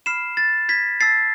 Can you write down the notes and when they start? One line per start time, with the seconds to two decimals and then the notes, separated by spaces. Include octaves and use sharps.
0.06 B5 F6 C7 E7
0.37 A6
0.69 G#6 B6
1.00 A5 E6 A6 C7